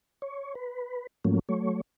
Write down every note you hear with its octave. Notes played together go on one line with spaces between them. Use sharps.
C#5
B4
G#2 F3 F#3 A3 A#3 C#4
F#3 A3 C#5